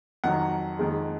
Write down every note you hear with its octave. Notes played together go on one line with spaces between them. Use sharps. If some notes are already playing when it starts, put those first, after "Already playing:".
F2 D#3 F#3 F#5
F2 D#3 G#3